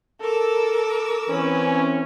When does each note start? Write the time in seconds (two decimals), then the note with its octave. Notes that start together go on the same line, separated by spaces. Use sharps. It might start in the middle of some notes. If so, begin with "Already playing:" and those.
0.21 A4 A#4 D6 E6
1.29 E3 C4 C#4 B4